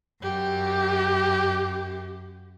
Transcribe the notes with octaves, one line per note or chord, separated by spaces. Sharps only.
F#2 G4